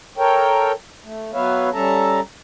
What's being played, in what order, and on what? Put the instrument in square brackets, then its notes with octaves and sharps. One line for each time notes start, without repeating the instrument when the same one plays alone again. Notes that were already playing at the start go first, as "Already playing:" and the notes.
[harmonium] A4 A#4 C#5 G5
A3
F#3 B3 B4 C#5 E5 F5
G3 C#4 A4 E5 A5 A#5